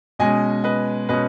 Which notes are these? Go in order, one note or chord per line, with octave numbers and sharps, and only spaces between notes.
B2 G#3 C#4 D#5 G#5
B4 D#5
B2 G#3 C#4 B4 D#5